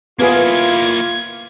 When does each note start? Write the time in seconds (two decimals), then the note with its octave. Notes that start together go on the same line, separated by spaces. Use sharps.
0.19 A#3 B3 E4 F4 G#4 G#6